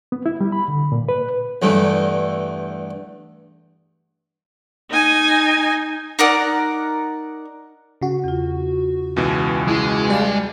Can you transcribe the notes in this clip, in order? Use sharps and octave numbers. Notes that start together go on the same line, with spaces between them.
B3
E4
G3
B5
D3
A#2
B4
E2 G2 A3
D#4 G#5
D#4 A#4 D5 F#5
C#3 F#4
E2 F4
C#2 B2 E3
G#3 E4 D6
G3 D5 F5 A5